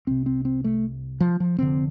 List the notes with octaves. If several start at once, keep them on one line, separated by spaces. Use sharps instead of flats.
C2 C3 C4
C4
C4
A3
F3
F3
F1 F2 D3 C4